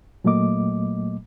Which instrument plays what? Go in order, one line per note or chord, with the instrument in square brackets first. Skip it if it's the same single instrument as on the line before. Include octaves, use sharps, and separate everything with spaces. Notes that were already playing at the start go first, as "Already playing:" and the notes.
[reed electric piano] A#2 F#3 A3 A#3 D#5 D6